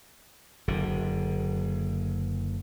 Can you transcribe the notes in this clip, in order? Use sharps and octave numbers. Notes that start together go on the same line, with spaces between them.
F#1 D3